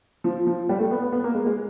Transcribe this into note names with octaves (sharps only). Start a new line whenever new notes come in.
F3
F3
G3
A3
B3
B3
B3
A#3
G#3
G#3